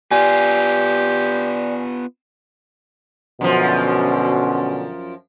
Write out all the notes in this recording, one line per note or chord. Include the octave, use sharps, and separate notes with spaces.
B3 F4 G4 D5 G#5
F#2 B2 D3 F3 C#4